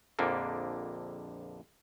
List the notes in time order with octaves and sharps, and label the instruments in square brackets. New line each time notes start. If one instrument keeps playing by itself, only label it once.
[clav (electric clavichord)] A#1 F2 D3 A#3